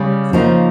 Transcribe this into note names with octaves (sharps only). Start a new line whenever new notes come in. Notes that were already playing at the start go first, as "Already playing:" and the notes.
Already playing: C#3 G3 C#4
C#3 F3 A#3 D#4